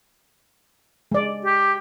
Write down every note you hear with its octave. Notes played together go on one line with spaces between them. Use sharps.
G#3 D5
G4